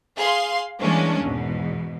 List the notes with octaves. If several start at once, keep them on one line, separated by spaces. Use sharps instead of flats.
G#4 F5 C6
E3 G3 G#3 A#3 C#4 D4
E2 G#2 B2